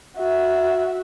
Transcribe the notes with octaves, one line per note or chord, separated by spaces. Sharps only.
F#4 E5